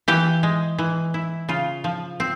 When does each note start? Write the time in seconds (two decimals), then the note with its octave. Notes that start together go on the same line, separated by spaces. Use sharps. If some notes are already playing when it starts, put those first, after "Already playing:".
0.08 E3 G4
0.43 G#3
0.78 E3
1.14 E4
1.49 C#3 F4
1.84 F3
2.20 C4